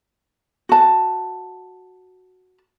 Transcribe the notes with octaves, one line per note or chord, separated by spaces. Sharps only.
F#4 A5